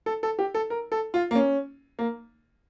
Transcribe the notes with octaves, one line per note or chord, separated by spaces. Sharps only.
A4
A4
G4
A4
A#4
A4
F4
A#3
C#4
A#3